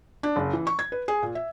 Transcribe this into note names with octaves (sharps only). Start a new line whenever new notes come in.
D4
F#1
E3
C#6
G#6
B4
G#4
A#2
E5